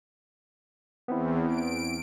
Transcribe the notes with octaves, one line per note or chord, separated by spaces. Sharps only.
E2 B3 C4 E4
D7